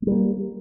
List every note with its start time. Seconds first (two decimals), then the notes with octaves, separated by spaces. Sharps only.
0.02 G#3
0.07 G3
0.12 A#3